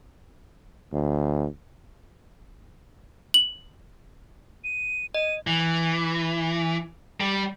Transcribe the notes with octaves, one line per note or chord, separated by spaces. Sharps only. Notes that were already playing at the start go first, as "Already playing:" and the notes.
D2
F#7
D#7
D#5 D#7
E3
G3